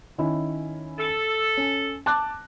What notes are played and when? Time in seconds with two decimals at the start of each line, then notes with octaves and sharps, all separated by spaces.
0.18 D#3 C#4 E4
0.99 A4
1.57 C#4
2.06 A5 D6 F#6